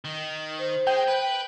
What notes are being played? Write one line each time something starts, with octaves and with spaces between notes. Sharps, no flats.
D#3
C5
G#3 G5
B4